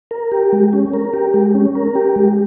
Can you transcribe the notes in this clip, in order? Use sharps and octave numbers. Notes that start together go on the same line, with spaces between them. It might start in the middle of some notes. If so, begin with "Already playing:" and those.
A#4
G4
G#3
C#4
A#4
G4
G#3
C#4
A#4
G4
G#3